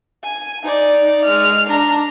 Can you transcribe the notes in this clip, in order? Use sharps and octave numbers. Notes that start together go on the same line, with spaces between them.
G#5
D#4 D5
G#3 F6
D4 A#5